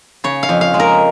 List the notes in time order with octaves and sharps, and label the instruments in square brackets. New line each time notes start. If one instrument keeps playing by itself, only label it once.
[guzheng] C#3 C#5
F5
F2
F5
G#3
A#4